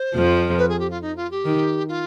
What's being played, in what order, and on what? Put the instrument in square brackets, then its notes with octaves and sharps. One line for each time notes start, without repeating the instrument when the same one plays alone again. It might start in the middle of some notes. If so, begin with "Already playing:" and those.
Already playing: [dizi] C5
[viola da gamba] F2 F3
[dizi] B4
G#4
G4
F4
D#4
F4
G4
[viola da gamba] D#3
[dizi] F4